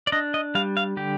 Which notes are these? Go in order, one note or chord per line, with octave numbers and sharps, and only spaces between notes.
D5
D4 D#5
D#5
G3 F5
F5
D3 G4